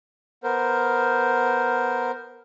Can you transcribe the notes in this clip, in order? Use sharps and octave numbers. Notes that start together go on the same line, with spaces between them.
B3 A#4 C5